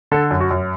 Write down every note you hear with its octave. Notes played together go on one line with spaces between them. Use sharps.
D3 A4
F#2
F#4
F#2